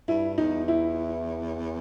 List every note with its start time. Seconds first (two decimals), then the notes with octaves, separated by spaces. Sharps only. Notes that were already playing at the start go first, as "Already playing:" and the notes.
0.08 G2 E4
0.38 E2 D#4
0.68 E4